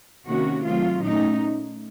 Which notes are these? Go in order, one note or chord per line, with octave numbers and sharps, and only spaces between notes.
C3 D#3 A#3 C#4 F#4
C3 D#3 F#3 A3 C4 F4
A#2 A3 C#4 D#4